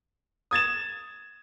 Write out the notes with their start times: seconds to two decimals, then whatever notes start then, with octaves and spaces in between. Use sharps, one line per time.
0.51 D#6 G#6 A6 E7